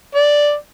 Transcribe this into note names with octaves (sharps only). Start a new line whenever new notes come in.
D5